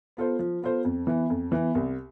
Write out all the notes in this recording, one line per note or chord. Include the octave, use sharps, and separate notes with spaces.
B3 F4 A4 C5
F3
B3 F4 A4 C5
F2
E3 B3
F2
E3 B3
C2